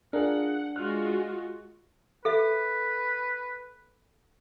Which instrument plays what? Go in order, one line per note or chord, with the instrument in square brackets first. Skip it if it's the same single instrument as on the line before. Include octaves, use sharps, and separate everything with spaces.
[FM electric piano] D4 [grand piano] F4 G#4 A#4 [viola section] F#5
[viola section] G#3 F4 F#4 [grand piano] F6 F#6
[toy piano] A4 E5 [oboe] B4